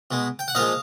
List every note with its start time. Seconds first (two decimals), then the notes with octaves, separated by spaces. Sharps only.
0.11 B2 G#3
0.39 G5
0.48 F#5
0.55 A#2 F3 G#3 D#5 F5